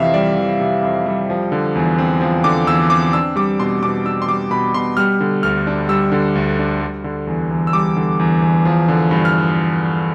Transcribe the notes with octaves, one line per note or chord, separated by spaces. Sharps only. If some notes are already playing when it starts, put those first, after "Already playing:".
Already playing: F2 C3 E3 E5 F5
G3 D5
E3
C3
F2
G3
F3
D3
E2
C4
F3
D3 D6
E2 E6
C4 D6
D4 E6
G3 D6
B2 C6
B2 D6
D4 E6
C6
G3 D6
B2 B5
B2 C6
G3 F6
D3
D2 F6
D4
G3 E6
D3
D2
D4
G3
D3
E2
E2
E6
G3 D6
D3
E2
E2
F3
D3
G2
F6